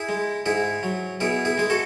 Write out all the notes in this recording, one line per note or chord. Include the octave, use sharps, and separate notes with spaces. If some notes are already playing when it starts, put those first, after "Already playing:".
Already playing: E4 G#4
G#3
G#2 E4 G#4
F#3
B2 E4 G#4
E4 G#4
G#3 G#4
F#4 A4